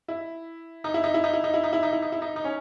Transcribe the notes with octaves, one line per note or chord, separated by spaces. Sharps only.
E4
D#4
E4
D#4
E4
D#4
E4
D#4
E4
D#4
E4
D#4
E4
D#4
E4
D#4
D#4
C#4